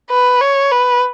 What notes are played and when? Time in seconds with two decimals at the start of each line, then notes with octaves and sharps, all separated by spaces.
0.10 B4
0.41 C#5
0.71 B4